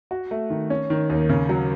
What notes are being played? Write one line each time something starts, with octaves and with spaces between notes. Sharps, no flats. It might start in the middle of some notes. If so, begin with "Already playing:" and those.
F#4
A3
D#3
C#4
D#3
D#2
C#3
F#3